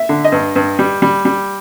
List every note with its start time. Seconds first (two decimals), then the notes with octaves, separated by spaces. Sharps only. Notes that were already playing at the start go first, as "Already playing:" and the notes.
Already playing: E5
0.09 D3
0.24 D#5
0.32 G2
0.56 G2
0.79 G3
1.02 G3
1.25 G3